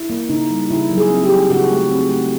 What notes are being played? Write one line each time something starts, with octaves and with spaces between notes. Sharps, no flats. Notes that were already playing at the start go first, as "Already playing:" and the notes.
Already playing: E4
A#3
C#3 D#4
G3
C#3 E4
F#3
G#4
C4
G4
F#3
C#3 F#4
A3
C4
A3